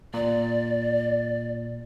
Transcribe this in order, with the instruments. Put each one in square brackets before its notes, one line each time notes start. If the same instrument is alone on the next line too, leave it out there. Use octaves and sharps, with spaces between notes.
[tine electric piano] A#2 [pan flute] D5